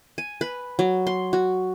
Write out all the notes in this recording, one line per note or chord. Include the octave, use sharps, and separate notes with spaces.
G#5
B4
F#3
C6
F#4